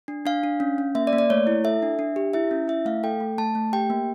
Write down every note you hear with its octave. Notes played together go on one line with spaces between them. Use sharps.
D4
D4 F5
D4
C#4
C#4
A#3 E5
D5
A#3
D5
A3 C#5
E4
A4 E5
D4
D4
G4
E4 E5
C#4
E4 E5
A3 F5
A4 G5
A3
A3 A5
A3
G4 G5
A#3